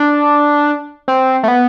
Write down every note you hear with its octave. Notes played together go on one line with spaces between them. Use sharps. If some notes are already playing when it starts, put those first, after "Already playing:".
Already playing: D4
C4
A3
B3